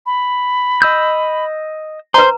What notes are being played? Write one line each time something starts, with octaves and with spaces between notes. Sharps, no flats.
B5
D#5 E6 G6
B4 C5 A#5